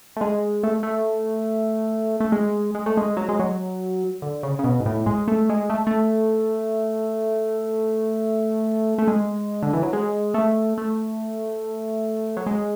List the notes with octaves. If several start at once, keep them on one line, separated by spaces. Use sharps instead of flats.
A3
G#3
A3
A3
A3
G#3
G#3
A3
G#3
F#3
G#3
F#3
D3
C#3
C#3
B2
G#2
A2
G#3
A3
G#3
A3
A3
A3
G#3
D3
E3
F#3
G#3
A3
A3
F#3
G#3